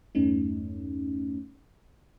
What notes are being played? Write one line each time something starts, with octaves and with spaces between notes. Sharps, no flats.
E2 G2 A3 C#4 D#4